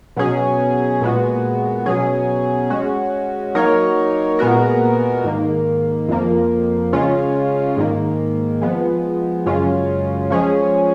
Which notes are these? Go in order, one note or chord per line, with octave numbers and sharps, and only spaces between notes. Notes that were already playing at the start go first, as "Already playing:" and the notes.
B2 F#3 C#4 G#4
A#2 G#3 B3 F#4
B2 F#3 C#4 G#4
G#3 C#4 F#4
F#3 A#3 D#4 A#4 C#5
A#2 G#3 B3 F#4 A#4
G#2 D#3 A#3
F2 F3 A#3
C#3 G#3 C#4 F4
G#2 D#3 A#3
F3 G#3 B3
F#2 C#3 G#3 C#4 F4
F3 G#3 C#4 G#4